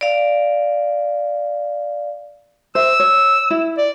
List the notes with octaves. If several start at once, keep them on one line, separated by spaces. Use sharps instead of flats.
D5 F5
C5 E5 E6
C#5
E4
D5